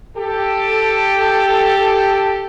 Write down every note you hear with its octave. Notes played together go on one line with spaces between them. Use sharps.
G4 A4